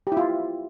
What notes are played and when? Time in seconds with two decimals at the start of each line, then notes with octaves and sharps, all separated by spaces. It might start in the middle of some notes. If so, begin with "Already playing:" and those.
0.07 G4
0.12 E4
0.17 F4